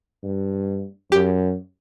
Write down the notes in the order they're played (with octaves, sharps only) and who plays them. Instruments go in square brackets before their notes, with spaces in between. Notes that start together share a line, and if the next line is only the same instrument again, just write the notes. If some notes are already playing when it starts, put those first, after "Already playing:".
[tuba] G2
[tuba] F#2 [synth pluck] G4